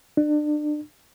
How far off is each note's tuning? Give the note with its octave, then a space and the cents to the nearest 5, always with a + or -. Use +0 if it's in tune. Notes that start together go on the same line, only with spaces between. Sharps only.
D4 +30